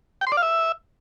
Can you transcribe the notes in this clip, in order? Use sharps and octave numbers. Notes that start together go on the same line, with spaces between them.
G5
C6
D5
F5
E5